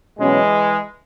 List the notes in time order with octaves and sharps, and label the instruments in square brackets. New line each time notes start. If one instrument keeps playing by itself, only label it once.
[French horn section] B2 F#3 C#4 F#4 [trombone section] E3 G#3